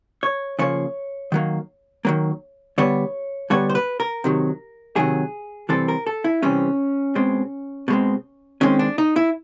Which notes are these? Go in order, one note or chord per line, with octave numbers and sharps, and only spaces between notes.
C#5
C#3 F3 A#3 C#5
D#3 F#3 A#3
D#3 F#3 A#3
D3 G3 B3 C#5
D3 G3 B3 C#5
C5
B4
A#4
C3 D#3 F#3
C3 D#3 F#3 G#4
C3 E3 G3 C4 A4
A#4
A4
E4
C3 E3 G3 C4 C#4
B2 G#3 C4
B2 G#3 C4
D#3 G#3 C4 C#4
D4
D#4
E4